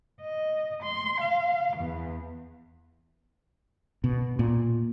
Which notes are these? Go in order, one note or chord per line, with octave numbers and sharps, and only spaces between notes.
D#5
C6
F5
E2
B2
A#2